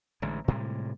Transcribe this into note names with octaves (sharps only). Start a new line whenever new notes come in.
A1 D3 G#3
A2 C3 G3 G#3